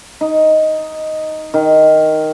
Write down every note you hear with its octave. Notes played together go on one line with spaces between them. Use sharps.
D#4
D#3